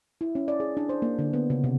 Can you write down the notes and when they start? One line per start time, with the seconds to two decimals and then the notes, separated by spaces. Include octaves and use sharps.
0.21 E4
0.35 C#4
0.48 D5
0.60 G#4
0.77 D4
0.89 C5
1.02 A#3
1.19 D3
1.33 B3
1.50 C#3
1.64 C3